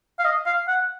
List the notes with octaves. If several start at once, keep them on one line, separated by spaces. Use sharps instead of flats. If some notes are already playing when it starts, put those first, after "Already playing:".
F5
D#5
F5
F#5